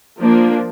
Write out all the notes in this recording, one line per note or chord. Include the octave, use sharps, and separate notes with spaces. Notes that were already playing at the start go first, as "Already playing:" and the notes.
F3 A#3 D4